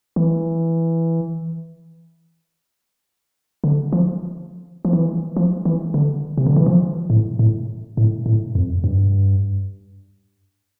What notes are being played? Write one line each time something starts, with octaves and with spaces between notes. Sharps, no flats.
E3
D3
F3
F3
E3
F3
E3
D3
C3
D3
E3
F3
A2
A2
A2
A2
F2
G2